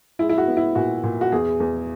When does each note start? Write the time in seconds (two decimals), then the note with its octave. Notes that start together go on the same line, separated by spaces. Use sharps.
0.19 G#3 E4
0.29 E4
0.38 F#4
0.47 B3
0.57 E4
0.75 A#2 F#4
1.04 A#2
1.21 F#4
1.32 E2 G#4
1.60 E2